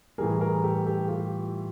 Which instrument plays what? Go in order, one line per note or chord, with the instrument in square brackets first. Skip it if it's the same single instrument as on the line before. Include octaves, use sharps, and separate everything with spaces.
[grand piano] A2 E3 G3 G#4 A#4
G#4 A#4
G4 A4
G4 A4
F4 G4